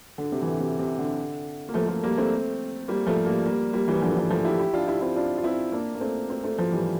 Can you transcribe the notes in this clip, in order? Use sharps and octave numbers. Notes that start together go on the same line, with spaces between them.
D3
C3
E3
D3
C3
C3
D3
A#3
F3 A3
F3 A3
G3 A#3
A3 C4
G3 A#3
F3 A3
G3 A#3
G3 A#3
G3 A#3
E3 G3
D3 F3
G3
D3 F3
F3 A3
E4 G4
E4 G4
D4 F4
E4 G4
C4 E4
D4 F4
F4
C4 E4
A#3 D4
A#3
A3 C4
A3 C4
A3 C4
F3 A3
E3 G3